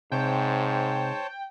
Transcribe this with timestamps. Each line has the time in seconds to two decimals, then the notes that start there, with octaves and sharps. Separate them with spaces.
0.12 G#2 C3 C5 C#5 G5 A5